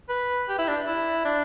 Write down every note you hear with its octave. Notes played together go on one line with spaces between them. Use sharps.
B4
G4
E4
D4
E4
D4